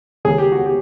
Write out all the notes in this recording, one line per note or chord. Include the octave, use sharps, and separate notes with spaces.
C#2 C3 D#3 G#4
G4
F#4
G4